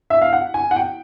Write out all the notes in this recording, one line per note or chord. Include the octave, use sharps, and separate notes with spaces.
E5
F5
F#5
G#5
F#5
G5